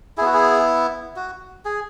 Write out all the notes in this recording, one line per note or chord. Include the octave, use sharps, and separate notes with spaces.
B3 E4 F#4 G#4
G#4
F#4
G#4